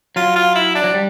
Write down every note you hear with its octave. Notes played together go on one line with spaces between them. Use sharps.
F#3 F4
F4
E4
D4
F#3
G3